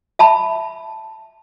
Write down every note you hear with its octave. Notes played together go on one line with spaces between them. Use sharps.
E5 A5 B5